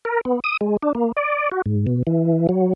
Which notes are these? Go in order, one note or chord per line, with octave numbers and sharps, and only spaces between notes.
A#4
B3
D#6
G#3
D4
A#3
D5
F#4
G#2
B2
E3
F#3